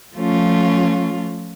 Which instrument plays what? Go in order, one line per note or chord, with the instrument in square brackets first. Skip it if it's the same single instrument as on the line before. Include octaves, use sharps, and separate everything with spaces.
[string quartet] F3 A3 C#4 F4